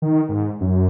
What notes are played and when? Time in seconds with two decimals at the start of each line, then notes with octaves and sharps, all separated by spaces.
0.02 D#3
0.29 G#2
0.61 F#2